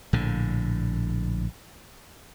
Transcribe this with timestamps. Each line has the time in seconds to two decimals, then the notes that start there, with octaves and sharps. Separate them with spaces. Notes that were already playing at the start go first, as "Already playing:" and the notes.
0.13 A#1 A2 D3